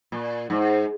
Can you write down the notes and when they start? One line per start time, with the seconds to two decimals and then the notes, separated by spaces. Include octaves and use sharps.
0.12 A#2
0.50 G#2